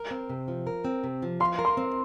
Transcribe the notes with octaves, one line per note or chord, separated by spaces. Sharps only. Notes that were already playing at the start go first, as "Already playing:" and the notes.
Already playing: A#4
C4
C3
F3
A#4
C4
C3
F3
F5 C6
A#4
C6
C4